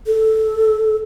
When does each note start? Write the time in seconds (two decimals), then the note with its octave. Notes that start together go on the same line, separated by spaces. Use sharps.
0.07 A4